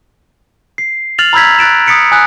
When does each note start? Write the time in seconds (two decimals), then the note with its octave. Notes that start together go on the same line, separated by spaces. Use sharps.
0.78 C7
1.18 F6 A6 F7 F#7
1.33 A#5 B5 E6 G6 G#6 B6
1.59 F#6 A6 D7 E7
1.87 D#6 A6 B6 C#7 D7
2.12 G#5 D#6 F#6